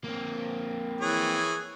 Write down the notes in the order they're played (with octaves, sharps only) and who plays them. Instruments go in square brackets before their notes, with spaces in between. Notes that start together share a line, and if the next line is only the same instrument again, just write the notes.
[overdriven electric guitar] A#3 C4
[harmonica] E3 G#4 C#5